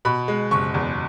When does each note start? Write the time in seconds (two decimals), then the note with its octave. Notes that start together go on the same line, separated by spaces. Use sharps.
0.05 B2 B5
0.28 G#3
0.51 F#1 C#6
0.74 E2